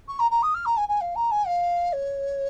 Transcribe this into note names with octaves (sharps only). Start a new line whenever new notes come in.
C#6
A#5
A#5
D#6
F6
A#5
G#5
G#5
F5
A#5
G#5
F5
C#5